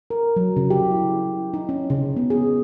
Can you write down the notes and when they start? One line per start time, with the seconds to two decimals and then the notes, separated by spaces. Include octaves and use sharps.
0.10 A#4
0.36 F#3
0.57 C#3
0.70 G4
0.91 E4
1.54 D#4
1.69 C#4
1.90 C#3
2.17 B3
2.30 G#4